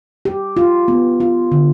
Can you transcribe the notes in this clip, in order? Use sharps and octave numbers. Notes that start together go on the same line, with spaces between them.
G4
F4
B3
F4
D3